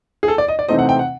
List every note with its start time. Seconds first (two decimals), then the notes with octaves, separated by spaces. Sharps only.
0.23 G#4
0.28 A4
0.38 D5
0.48 D#5
0.59 D5
0.68 C3 E3 A3 C4 D#4 D#5
0.79 F#5
0.89 G5
0.99 F#5